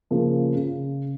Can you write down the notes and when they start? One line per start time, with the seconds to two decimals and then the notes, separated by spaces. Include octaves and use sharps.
0.11 C#3 F3 A#3
0.56 C#3